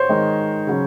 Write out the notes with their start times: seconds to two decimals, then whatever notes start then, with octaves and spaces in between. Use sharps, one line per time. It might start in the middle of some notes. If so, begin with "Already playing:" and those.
Already playing: C5 C#5
0.09 D#3 G#3 D#4 A#4
0.67 C#3 F#3 C#4